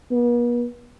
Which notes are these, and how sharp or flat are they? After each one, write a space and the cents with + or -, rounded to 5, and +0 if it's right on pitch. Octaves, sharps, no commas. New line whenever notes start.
B3 -45